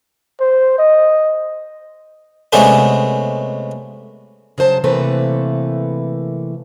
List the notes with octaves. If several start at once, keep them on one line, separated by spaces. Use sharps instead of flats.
C5
D#5
C3 G#3 A3 B3 C#4 D4
C#3 F#3 C5 A5
C3 E3 A3 A#3 A4 B4